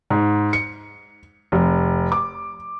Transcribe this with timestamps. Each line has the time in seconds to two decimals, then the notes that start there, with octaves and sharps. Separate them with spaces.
0.10 G#2
0.53 C#7
1.52 F1
2.12 D6